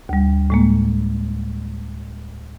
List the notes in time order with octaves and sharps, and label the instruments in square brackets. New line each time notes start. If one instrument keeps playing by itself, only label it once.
[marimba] D2 G3
A2 G#3 A#3